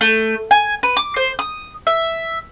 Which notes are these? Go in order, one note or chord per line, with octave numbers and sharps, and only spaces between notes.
A3
G#5
B4
D6
C5
D#6
E5